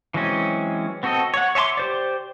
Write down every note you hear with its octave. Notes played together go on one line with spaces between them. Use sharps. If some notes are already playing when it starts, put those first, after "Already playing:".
E3 F#3 G#3 C4 C#4
B3 C4 F#4 A4 D#5
C#5 F#5
C#5 E5 G#5 C6 D6
G4 C5 D5